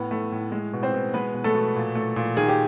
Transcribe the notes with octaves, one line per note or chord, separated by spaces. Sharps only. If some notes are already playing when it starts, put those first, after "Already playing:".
Already playing: A2 B3
A3
A2
G#3
B2
C4 C5
B2
G#3 B3 B4
B2
A3 A4
B2
A#2
A3
A#2
D#3 G#4
G4